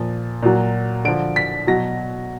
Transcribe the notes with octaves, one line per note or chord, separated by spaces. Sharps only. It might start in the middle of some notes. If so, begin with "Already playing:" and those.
Already playing: A#2 F3
A#2 F#3
D3 F3 D7
B6
B2 F#3 A#6